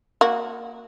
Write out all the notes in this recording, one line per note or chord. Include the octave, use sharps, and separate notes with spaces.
A#3 F#4